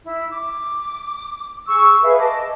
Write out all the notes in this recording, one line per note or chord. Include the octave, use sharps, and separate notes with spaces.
E4
D6
G#4 C#6 E6
G#4 B4 E5 F5
D#5 A5 D6